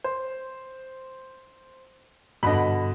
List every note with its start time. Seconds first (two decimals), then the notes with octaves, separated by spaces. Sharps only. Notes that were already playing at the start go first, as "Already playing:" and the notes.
0.04 C5
2.43 G2 B2 D3 D#5 B5